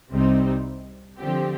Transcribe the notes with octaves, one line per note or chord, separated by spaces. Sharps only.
C2 C3 G3 C4 D#4
D3 F3 C4 G4